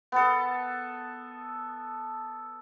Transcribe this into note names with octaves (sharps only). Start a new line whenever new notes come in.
B3 A4